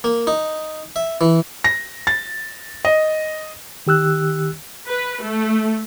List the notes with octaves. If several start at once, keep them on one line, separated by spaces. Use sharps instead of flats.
A#3
D#4
E5
E3
A#6
A6
D#5
D#3 G4 E6 F#6
B4
A3